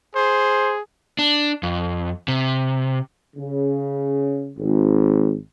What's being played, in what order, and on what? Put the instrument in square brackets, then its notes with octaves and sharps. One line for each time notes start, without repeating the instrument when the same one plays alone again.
[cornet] G#4 [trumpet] C5
[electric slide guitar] D4
F2
C3
[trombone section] C#3
G#1